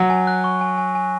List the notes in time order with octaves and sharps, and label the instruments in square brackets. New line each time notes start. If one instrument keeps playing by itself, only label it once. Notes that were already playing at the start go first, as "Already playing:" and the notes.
Already playing: [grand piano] F#3
[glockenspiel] G#5
F#6
C#6
G#5
G#5
G#5